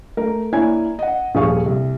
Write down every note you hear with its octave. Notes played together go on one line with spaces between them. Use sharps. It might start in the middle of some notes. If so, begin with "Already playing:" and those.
A3 A#4
A#3 D4 E4 C#5 G#5 G#6
D#5 F#5
D#1 F3 G#4 F5 C#6
C2